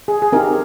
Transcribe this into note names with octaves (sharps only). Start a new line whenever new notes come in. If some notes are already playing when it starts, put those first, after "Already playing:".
G#4
G#4
C4 D#4 G4 A#4